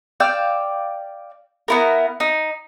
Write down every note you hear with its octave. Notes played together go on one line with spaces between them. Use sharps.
D5 F5 G5 E6
B3 E4 A#4
D#4